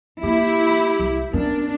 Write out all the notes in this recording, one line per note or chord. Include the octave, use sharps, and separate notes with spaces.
A#3 E4 G4
C2
B3 C#4 D4 A#4